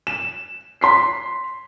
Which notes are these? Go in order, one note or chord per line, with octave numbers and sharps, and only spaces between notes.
E7
C6 B6 C7